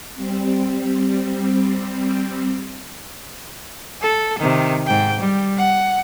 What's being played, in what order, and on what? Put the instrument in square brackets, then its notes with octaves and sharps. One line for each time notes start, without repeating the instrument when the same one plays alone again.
[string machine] G3 C4
[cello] A4
C3 D#3
G#2 G5
G3
F#5